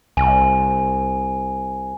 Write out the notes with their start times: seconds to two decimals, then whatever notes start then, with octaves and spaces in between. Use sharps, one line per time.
0.17 C2 G#5